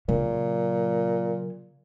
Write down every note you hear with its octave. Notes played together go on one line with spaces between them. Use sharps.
A#2 C#3 F#3